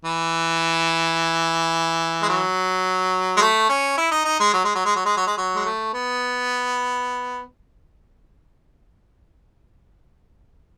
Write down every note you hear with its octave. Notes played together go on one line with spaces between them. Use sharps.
E3
G#3
F#3
G#3
A3
C#4
E4
D#4
D#4
G#3
F#3
G#3
F#3
G#3
F#3
G#3
F#3
G#3
F#3
G#3
A3
B3